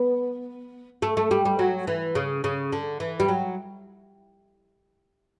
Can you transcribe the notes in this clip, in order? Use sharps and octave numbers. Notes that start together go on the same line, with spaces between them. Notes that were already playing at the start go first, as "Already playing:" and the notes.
Already playing: B3
A3
A3
G3
G3
F#3
E3
C#3
C#3
D3
E3
G3
F#3